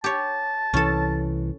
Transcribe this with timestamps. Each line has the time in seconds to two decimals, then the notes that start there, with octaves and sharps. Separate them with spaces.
0.04 G4 C#5 A5
0.74 C2 E3 C#4 A4